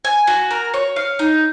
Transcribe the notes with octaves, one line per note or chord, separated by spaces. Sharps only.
G#5
F#4
A#4
C#5
F5
D#4